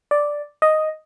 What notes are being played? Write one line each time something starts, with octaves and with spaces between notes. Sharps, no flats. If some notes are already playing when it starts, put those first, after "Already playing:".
D5
D#5